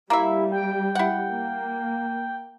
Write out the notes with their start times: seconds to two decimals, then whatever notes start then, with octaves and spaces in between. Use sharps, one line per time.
0.10 G3 A#3 E4 E5
0.52 G5
0.95 E4 F#5
1.29 A#3